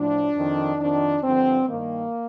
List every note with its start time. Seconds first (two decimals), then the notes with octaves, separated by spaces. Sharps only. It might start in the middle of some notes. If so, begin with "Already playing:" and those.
Already playing: A2 F3 D4
0.35 F2 D#3
0.79 F2 D#3 D4
1.23 G2 D3 F3 C4
1.68 G2 D#3 A#3